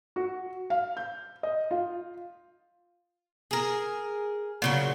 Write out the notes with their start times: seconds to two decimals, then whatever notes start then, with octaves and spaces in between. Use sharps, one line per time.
0.16 F#4
0.70 F5
0.97 G6
1.43 D#5
1.71 F4
3.51 G#4 A#4
4.62 A#2 C#3 F#3